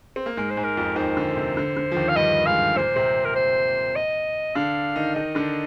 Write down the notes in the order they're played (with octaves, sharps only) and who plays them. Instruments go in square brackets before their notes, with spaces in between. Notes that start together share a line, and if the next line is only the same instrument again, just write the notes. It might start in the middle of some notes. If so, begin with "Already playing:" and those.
[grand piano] C4
A#3
[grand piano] G#2 G#3 [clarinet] A#4
[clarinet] C5
[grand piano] G#2 G#3
[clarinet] A#4
[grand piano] F2 F3
[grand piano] D#2 D#3 [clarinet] C5
[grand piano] D3
C3
D3
D3
F3
D#2 D#3
[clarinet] F5
[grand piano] G2 G3 [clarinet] D#5
[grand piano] G#2 G#3 [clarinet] F5
[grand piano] A#2 A#3 [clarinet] C5
[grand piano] C3 C4
[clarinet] A#4
C5
D#5
[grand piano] D3 D4 [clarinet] F5
[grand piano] D#3 D#4
[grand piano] D#3 D#4 [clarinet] D#5
[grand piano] D3 D4